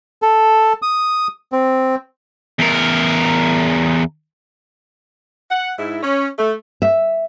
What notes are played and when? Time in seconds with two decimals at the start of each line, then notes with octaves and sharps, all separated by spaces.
0.22 A4
0.82 D#6
1.52 C4
2.59 E2 A#4
5.50 F#5
5.79 G#2 E4
6.03 C#4
6.39 A3
6.82 E5